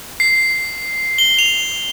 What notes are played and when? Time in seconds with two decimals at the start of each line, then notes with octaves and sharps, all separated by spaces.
0.20 C7
1.18 G7
1.39 F7